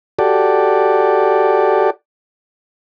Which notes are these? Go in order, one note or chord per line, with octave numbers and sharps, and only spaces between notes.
F#4 G4 A4 D5